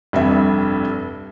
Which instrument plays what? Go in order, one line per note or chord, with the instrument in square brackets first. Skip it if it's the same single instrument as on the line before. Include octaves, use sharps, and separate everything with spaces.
[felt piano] F1 C2 G2 E5